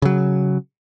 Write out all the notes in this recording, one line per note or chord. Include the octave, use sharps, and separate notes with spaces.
C#3 F#3